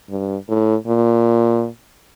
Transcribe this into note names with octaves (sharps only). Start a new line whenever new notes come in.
G2
A2
A#2